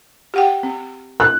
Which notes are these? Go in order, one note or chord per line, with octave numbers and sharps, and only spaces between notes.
G4 F#5 G5
C4
F#6